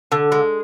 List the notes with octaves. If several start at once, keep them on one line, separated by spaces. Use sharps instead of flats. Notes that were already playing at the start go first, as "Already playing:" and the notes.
D3
G#3